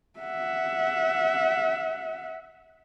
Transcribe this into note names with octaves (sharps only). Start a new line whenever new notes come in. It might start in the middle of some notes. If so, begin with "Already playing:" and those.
E5 F#5